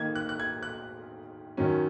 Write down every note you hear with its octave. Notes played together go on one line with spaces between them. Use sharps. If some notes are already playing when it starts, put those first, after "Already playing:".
Already playing: D#3 A#3 D#4 G#6
F#6
F#6
G#6
F#6
F#2 D#3 F#3 C#4